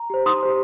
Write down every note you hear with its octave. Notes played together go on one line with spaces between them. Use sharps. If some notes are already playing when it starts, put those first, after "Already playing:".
Already playing: A#5
G4 C5
D#4 C6 D#6
G4 C5